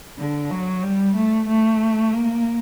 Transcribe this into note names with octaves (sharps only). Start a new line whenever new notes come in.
D3
F#3
G3
A3
A3
A#3